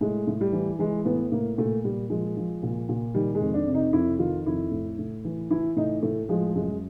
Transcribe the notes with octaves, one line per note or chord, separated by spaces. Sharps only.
A2 G#3
A2
G3
E3
E3 G#3
A2 B3
A2 A#3
A#2 A3
A#2 G3
F3 G#3
F3
A#2
A#2
D#3 G3
G#3
F2
D4
C3
D#4
F2 E4
D#3 F4
F2 E4
A2
A2
E3
E3 E4
A2 D#4
A2 A3
F3 G#3
F#2 G#3